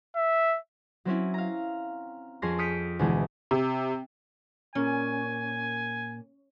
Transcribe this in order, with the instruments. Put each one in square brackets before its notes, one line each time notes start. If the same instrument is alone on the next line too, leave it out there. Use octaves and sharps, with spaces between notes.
[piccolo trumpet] E5
[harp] F#3 C4 C#4 E4
F5 A#5
F2 C#4 G#4 C6 A#6
D#6 F6 G6 B6 C#7 D7
D2 B2 E3 G#3
[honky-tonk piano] C3
[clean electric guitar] A#2 A#4 [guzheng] C#4 [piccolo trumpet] G#5